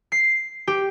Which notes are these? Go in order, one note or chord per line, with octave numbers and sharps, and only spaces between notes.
C7
G4